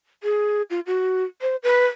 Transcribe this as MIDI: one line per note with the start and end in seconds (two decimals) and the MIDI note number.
0.23 0.62 68
0.70 0.80 65
0.86 1.23 66
1.42 1.56 72
1.63 1.85 71